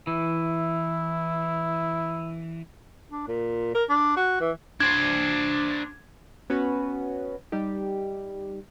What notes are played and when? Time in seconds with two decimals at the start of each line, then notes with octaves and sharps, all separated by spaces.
0.07 E3 E4
3.11 D4
3.28 A#2
3.75 A#4
3.89 D4
4.17 F#4
4.41 E3
4.80 D4 C5 G#6
6.50 B3 C#4 F#4 B4
7.52 G3 D#4 G4